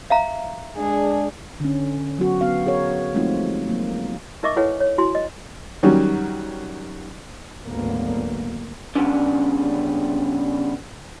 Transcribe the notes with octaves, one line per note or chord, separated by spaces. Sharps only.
E5 F5 A#5
G#3 D4 G#4
D3 C#4
F#3 B3 F#4
B3 F#4 F5
G#4 A#4 C#5
F3 G#3 A3 C4 D#4 F4
F#3 A#3
D#4 A#4 D#5 E5 C#6 D6
E4 A4 B4 C#5 F#5 G#5
C#5
E4 F#4 G#5 C6
D#5
D#3 F#3 G3 C#4
G#1 D2 D3 F#3 A#3 B3
C#3 F3 G3 B3 C#4 D4